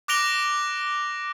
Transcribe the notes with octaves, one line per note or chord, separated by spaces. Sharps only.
D6 F#6 A#6 D7 F7 G7